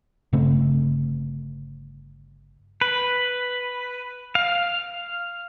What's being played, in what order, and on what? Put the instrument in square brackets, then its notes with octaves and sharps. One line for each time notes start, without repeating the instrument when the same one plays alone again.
[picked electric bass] G1 C#3 A3 C4
[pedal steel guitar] B4
F5